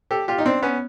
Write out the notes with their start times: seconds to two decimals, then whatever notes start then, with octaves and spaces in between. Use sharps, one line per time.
0.11 G4 A4
0.28 F4 G4
0.38 D#4
0.46 C4 D4
0.62 B3 C#4